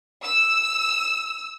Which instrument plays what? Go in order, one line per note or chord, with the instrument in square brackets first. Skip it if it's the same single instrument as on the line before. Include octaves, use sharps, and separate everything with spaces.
[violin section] E6